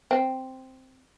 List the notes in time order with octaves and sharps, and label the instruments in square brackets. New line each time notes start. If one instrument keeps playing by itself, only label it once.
[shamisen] C4